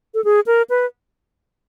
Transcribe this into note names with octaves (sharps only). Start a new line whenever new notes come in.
A4
G#4
A#4
B4